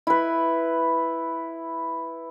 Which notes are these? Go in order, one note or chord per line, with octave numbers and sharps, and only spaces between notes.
E4 B4